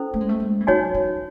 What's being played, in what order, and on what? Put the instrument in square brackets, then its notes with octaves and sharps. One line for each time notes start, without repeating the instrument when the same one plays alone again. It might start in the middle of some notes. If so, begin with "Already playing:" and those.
Already playing: [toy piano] C#4 E4 A4 C5
[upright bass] A3
G#3
A3
G#3
E3
[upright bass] F#3 [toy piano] D#4 F#4 C#5 G#5
[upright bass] E3